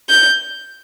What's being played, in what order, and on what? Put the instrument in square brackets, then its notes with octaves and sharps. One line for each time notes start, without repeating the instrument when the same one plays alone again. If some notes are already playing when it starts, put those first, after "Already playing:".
[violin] G6